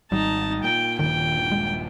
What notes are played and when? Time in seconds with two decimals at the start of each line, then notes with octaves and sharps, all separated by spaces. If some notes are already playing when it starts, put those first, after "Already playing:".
0.12 G#1 G3 D#4 A5
0.64 A#2 G5
0.99 D#1 G2 A#2 D#3 G5
1.52 G#3